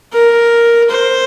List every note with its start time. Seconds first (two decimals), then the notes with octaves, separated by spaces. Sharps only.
0.13 A#4
0.90 C5